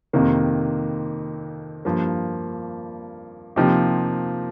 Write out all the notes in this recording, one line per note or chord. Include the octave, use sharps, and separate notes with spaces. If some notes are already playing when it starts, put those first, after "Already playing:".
F2 C3 D#3 A#3
G2 F3 A#3
C3 F3 A#3 D#4 G4